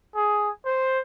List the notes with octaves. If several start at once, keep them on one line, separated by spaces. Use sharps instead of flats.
G#4
C5